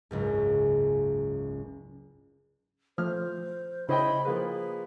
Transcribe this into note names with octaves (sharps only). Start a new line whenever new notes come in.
F#1 C#2 G#2
F3 A3 C5 F6
C#3 E4 C5 C#5 D#5 G5 B5
F3 A#3 G#4 B4